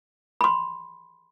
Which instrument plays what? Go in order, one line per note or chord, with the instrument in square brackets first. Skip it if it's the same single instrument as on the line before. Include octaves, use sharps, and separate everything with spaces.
[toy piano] B5 C6